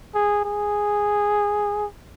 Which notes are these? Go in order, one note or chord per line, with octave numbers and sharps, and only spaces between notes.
G#4
G#4